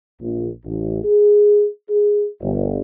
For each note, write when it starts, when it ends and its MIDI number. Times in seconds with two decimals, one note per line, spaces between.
0.21 0.48 34
0.65 0.99 33
1.04 1.66 68
1.89 2.25 68
2.41 2.80 31